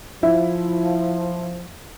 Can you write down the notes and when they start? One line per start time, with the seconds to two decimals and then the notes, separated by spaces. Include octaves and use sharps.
0.23 F3 E4 E5